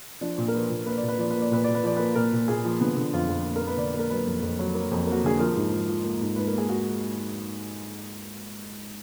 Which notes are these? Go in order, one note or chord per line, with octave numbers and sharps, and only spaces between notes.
F3 D4
A#2
A#4
F3 B4
A#2
A#3 B4
D5
A#2
B4
F3 D5
A#3 B4
D5
A#2 B4
A#2 D5
B4
F3 D5
A#3 B4
A#2 A#4
A#2
A#2 G#4
F3
D3 B3
D3
F2 F4
F2
A#3
A#4
A#3
B4
D3 D5
A#3
A#4
F#3 B4
F2
F2
F#3
A#3
F2
A#3 F#4
D3 G#4
F3 A#4
G#2
F3
F3
A#3
G#2
G#2 B4
A#4
A#3
G#4
F#4